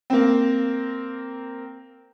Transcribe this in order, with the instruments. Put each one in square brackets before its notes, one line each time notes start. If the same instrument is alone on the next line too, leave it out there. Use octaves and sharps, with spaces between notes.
[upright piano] A#3 C4